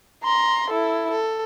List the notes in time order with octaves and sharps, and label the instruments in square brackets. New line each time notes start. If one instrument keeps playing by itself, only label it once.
[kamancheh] A#5 C6
E4 A4
A4